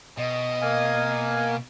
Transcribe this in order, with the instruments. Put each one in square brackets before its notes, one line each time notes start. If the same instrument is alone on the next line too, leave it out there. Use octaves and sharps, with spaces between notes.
[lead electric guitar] B2 [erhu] D#5
[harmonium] A#3 F5 G#5